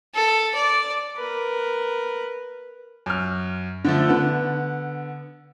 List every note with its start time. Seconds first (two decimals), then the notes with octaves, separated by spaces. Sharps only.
0.14 A4
0.55 D5
1.17 A#4 B4
3.06 F#2 F6
3.85 D3 F3 A3
4.09 D3 B3